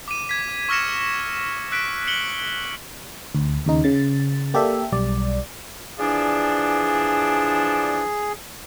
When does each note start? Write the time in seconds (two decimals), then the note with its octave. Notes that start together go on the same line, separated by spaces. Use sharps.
0.08 D6 D#7
0.29 G#6 B6
0.69 C#6 E6 F6 A#6 C#7 E7
1.72 E6 F#6 B6 D7
2.07 C#7 F#7 G7
3.35 D2
3.66 D#2 C#3 D#4
3.84 C#3 A6
4.54 A#3 G4 A4 D5 E5
4.92 B1 G3 D5
5.99 E3 F3 D4 G#4